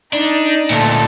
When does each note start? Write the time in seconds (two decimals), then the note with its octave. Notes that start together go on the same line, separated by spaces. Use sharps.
0.13 D4 D#4
0.70 D2 A#2 A4 A5